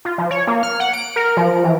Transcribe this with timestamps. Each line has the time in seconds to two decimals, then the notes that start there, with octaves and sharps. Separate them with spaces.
0.05 F4
0.18 F3
0.31 C#5
0.47 A#3
0.63 F6
0.80 F#5
0.93 D7
1.16 A#4
1.37 F3
1.64 E3